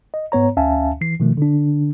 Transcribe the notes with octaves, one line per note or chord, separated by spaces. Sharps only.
D#5
G#2 B3 C#5 A#5
D2 C#4 E5 F5 G#5 A5
E3 C7
B2 D#3 F3 A3
D3 D4